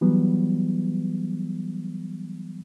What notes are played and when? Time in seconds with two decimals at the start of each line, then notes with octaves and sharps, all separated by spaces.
0.01 E3 F#3 G3 B3